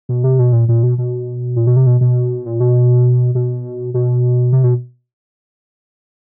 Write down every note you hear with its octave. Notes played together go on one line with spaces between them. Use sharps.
B2
C3
B2
A#2
A#2
B2
B2
A#2
B2
C3
B2
B2
A#2
B2
B2
B2
C3
B2